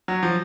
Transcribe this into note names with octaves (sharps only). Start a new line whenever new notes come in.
F#3
F3